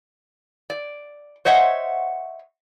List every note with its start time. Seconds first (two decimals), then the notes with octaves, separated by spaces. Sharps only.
0.70 D5
1.45 C5 C#5 D#5 E5 F#5